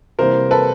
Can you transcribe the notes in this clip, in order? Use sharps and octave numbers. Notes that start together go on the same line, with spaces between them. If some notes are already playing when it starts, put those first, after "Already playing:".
C3 E3 G3 A#3 A#4 C5
A4 B4